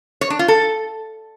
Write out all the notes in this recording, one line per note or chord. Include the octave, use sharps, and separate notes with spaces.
C#5
D4
F4
A4